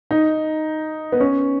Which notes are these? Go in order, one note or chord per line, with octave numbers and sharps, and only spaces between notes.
D#4
B3
C#4